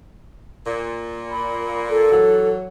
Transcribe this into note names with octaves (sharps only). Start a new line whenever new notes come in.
A#2
B5
A4
E3 F#3